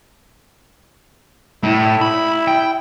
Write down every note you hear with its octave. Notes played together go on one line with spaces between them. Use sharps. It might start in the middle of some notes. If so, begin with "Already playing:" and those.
A2 E4
B5
G5